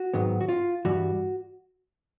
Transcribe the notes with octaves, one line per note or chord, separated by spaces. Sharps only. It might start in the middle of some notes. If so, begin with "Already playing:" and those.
Already playing: F#4
G#2 D#3 F#3 B3
F#4
F4
G2 E3 G3 F#4